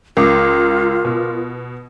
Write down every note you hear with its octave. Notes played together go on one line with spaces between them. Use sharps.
C#2 F4 A#4 D6 D#6
B2